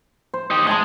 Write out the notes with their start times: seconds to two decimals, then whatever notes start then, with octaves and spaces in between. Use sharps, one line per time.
0.34 C5
0.51 D#4 G4
0.67 G#3 G#5 A5 C6